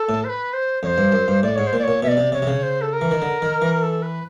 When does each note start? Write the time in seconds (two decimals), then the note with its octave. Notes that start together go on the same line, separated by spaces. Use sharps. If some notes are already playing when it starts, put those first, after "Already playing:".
Already playing: A4
0.09 A2
0.24 C5
0.29 B4
0.53 C5
0.83 F2 C#5
0.87 C5
0.98 G2
1.12 F#2
1.28 G2
1.43 A2 D5
1.55 G#2 C#5
1.67 C5
1.73 A#2
1.79 D5
1.83 A#2 C#5
2.03 B2 E5
2.08 D5
2.17 C3
2.32 C3 C#5
2.42 C3
2.47 C#3
2.62 C5
2.81 A4
2.93 A#4
3.01 E3
3.11 D#3
3.22 D3
3.42 D#3
3.62 E3
3.82 A4
4.02 B4